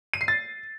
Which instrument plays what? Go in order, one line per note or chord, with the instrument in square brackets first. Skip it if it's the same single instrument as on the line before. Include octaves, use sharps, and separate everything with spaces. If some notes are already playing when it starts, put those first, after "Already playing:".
[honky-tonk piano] D#7
C7
A6